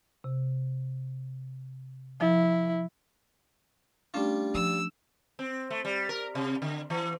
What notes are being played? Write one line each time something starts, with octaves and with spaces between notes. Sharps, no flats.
C3
F3 E4
G3 A3 C#4 D4 F4
F3 E6
C4
A3
G3
A#4
C3
D3
E3